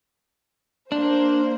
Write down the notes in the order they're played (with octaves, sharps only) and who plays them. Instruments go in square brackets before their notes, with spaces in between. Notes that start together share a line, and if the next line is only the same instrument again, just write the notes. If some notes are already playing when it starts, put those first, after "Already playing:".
[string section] A#3 C5 [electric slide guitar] D4